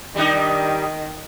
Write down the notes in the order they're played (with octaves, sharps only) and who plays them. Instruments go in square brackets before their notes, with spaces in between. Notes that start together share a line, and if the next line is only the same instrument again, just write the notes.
[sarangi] D#3 [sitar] G3 D4 D#4